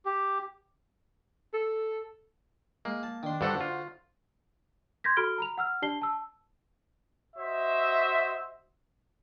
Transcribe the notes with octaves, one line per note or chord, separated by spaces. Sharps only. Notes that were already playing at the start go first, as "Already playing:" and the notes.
G4
A4
G#3 A#3
A5
D#3 D4 C6
G2 D3 F#4 A4 C5 F#5
F4
C6 G6 G#6 A#6 B6
F#4 A4 B5 F6 D7 G7
A#5 B5 F7
F#5 E6 F6
D4 G4 D5 A5 C7 G7
A5 E6
F#4 C5 D#5 E5